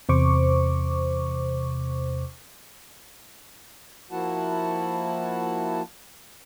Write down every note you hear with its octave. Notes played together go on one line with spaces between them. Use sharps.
E2 C3 C5 C#6 D6
F3 A#3 E4 F#4 F#5 A5